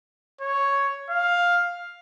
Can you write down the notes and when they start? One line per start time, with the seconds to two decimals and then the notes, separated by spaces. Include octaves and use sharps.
0.41 C#5
1.10 F5